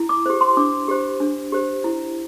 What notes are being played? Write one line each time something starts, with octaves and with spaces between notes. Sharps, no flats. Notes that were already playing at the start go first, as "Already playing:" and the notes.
Already playing: E4
D6
G4 C5
C6
D4 D6
G4 C5
D4
G4 C5
E4